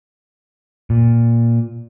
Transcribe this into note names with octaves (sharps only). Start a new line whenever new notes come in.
A#2